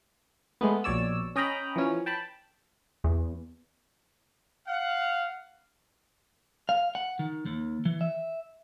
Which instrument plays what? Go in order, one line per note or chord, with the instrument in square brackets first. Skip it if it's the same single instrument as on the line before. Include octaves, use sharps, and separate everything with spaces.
[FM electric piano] G#3 A3 B3
A#1 B2 C#5 D5 E6
C#4 D#5 G5 A#5 B5
E3 F3 C#4
G5 A5 B5
[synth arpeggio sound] E2
[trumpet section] F5 F#5
[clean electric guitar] F5
F#5
D#3
D#2
E3
E5